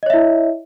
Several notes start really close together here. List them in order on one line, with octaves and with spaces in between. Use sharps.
D#5 C#5 E5 E4